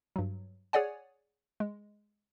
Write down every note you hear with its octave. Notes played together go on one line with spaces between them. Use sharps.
G2 F#3
G#4 C#5 D5 F#5 G#5
G#3